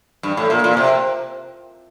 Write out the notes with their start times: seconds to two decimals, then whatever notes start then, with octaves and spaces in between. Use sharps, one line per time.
0.23 G2
0.37 A2
0.50 A#2
0.64 A#2
0.77 C3